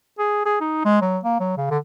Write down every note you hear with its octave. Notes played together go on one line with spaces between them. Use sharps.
G#4
G#4
D#4
G#3
F#3
A#3
F#3
C#3
D3